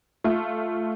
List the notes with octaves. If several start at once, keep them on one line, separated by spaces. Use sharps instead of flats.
A3 F4